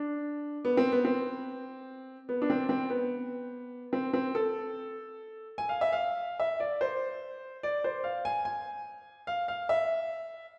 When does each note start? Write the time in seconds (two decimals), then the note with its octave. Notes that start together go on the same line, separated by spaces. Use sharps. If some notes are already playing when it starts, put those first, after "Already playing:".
Already playing: D4
0.65 B3
0.77 C4
0.92 B3
1.05 C4
2.29 B3
2.42 D4
2.50 C4
2.69 C4
2.90 B3
3.93 C4
4.13 C4
4.35 A4
5.58 G#5
5.69 F5
5.81 E5
5.93 F5
6.40 E5
6.60 D5
6.81 C5
7.63 D5
7.84 C5
8.04 F5
8.25 G#5
8.45 G#5
9.27 F5
9.48 F5
9.69 E5